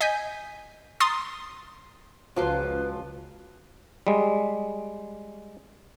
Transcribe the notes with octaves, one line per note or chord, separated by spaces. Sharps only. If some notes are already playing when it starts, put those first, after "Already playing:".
D#5 G#5 G6 B6
A#5 C6 D#6 A6
C#2 F3 F#3 F4 B4 C6 D6 E6
G3 G#3